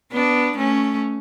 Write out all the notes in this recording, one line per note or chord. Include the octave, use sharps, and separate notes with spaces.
B3 D4
A3 C#4